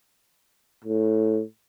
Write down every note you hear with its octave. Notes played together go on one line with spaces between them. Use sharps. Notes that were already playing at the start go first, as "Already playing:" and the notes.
A2